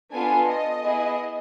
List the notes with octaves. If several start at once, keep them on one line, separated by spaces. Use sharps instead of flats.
B3 D4 F4 A4 G#5
D#5
B3 E4 G#4